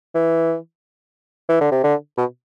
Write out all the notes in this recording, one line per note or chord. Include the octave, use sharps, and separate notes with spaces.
E3
E3
D3
C3
D3
B2